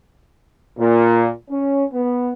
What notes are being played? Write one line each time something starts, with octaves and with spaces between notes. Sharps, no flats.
A#2
C#4
B3